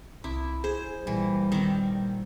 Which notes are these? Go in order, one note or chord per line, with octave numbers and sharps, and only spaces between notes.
C2 E4
G#4 C5
G#1 A#2 E3 G3
D#3 C4